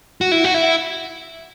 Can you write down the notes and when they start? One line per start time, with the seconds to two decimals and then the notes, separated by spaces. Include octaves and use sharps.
0.21 F#4
0.32 E4
0.44 F#4
0.54 E4